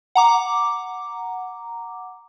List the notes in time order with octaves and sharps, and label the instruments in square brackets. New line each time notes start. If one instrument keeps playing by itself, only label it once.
[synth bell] F#5 A#5 D6